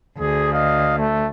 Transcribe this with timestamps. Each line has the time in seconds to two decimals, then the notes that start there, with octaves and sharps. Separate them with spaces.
0.18 D2 G#4
0.53 D#5 F5
0.98 A3